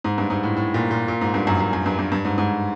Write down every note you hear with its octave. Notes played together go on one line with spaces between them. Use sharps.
G#2
G2
G#2
A2
A2
A#2
A#2
A#2
G#2
G2
F#2
F#2
F#2
G2
G2
G2
G#2
G#2